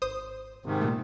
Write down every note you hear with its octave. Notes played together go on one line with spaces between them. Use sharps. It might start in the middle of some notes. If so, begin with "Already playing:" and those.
G#1 C5 D#6
G#2 C3 D#3
A#2 A3